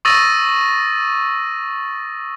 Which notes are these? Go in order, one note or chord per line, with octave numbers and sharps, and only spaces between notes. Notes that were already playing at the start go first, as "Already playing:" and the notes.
C#6 D#6 E6 A6 A#6 D#7